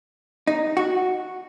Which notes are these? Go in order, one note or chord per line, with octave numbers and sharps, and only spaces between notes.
D#4
F#4